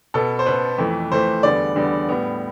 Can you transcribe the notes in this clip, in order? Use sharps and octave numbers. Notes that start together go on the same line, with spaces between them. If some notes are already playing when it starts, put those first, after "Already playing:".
B2 B3 A4
C5
B2 B3 B4
F2 E3 A3
F2 E3 A3 C5
E2 D3 G3 B3 D5
E2 D3 G3 B3
A2 G3 B3